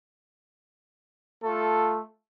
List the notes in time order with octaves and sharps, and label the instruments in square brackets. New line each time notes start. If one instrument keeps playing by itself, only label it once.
[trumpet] A3 [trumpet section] F4 A4